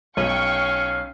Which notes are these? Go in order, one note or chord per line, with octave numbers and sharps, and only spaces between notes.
B1 C#4 F5 G5 C#6 F6 D#7